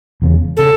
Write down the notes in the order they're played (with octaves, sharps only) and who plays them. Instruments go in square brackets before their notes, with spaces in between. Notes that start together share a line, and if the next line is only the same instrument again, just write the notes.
[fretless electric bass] E1 E2 C#3
[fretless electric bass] C#3 [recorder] A4